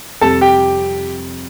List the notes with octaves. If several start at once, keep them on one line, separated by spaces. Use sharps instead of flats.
F2 C3 G3 A4 A5
G4 G5